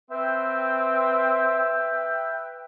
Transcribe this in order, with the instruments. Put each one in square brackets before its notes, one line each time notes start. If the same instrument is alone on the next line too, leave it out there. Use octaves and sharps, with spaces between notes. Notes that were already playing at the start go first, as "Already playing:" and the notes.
[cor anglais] C4 [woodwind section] B4 E5 G5